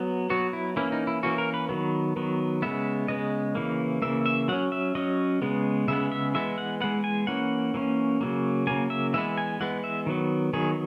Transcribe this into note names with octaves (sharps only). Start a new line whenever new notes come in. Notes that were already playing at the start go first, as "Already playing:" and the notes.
Already playing: F#3 B3
F#3 B3 F#4
E4
E3 A#3 C#4 E4
D#4
E4
E3 A#3 C#4 F#4
A#4
B4
D#3 F#3 B3
D#3 F#3 B3
C#3 G#3 B3 E5
C#3 G#3 B3 D#5
C#3 E3 A#3
C#3 E3 A#3 E5
E5
F#3 C#4 F#5
E5
F#3 C#4 D#5
C#3 G#3 B3
C#3 G#3 B3 E5
E5
E3 G#3 B3 E5
F#5
E3 G#3 B3 F#5
G#5
E3 A#3 C#4 F#5
E3 A#3 C#4
C#3 F#3 A#3
C#3 F#3 A#3 G#5
E5
E3 G#3 B3 E5
G#5
E3 G#3 B3 F#5
E5
D#3 F#3 B3
D#3 F#3 B3 G#4